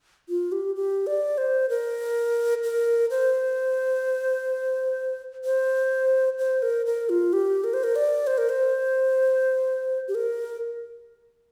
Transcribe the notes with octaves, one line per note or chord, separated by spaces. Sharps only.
F4
G4
G4
D5
C5
A#4
A#4
C5
C5
C5
A#4
A#4
F4
G4
A#4
C5
A#4
D5
C5
A#4
C5
G4
A#4